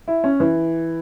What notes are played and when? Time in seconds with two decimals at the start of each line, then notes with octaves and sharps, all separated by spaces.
0.08 E4
0.24 C#4
0.40 E3